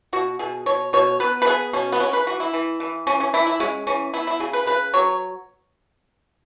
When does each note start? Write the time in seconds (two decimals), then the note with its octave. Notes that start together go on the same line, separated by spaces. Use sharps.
0.13 B2 F#4
0.39 B2 G#4
0.66 B2 C#5
0.93 B2 C#5
1.20 B3 B4
1.42 B4
1.46 B3 G#4
1.73 B2 C#4
1.92 B3
2.00 G#3 C#4
2.13 B4
2.26 E3 F#4
2.40 E4
2.53 E3
2.80 E3
3.07 E3 C#4
3.20 C#4
3.33 E3 E4
3.47 E4
3.60 G#3 C#4
3.87 E3 C#4
4.14 B3 E4
4.27 E4
4.40 C#3 G#4
4.53 B4
4.67 C#3 B4
4.94 F#3 C#5